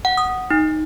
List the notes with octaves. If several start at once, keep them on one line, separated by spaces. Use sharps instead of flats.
F#5
D#6
D#4